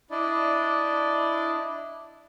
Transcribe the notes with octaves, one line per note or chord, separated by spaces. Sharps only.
D4 E4 D5 D#5